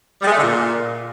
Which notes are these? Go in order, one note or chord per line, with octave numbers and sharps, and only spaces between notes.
G3
G#3
A3
D3
A#2